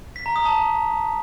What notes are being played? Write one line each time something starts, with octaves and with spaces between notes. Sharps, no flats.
B6
A#5
D#6
A5